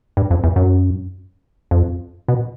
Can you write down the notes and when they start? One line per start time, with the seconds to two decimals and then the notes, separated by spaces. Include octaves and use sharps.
0.17 G2
0.31 F2
0.44 E2
0.56 F#2
1.71 F2
2.28 B2